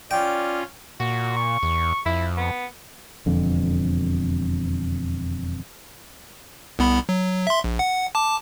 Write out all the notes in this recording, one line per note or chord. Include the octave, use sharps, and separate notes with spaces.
C#4 F4 D5 G5
A#2 F#4
C#6
E2
F2 E4
B3
E1 F2 D3
C2 B3 B5
F#3
E5 C6
A#1
F#5
A5 D6